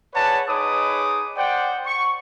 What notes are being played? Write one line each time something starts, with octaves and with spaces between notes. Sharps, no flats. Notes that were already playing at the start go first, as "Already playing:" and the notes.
G#4 B4 C#5 D5 F#5 A5
D#4 G#4 B4 C#5 D6 D#6
C5 D5 F#5 G5
C#6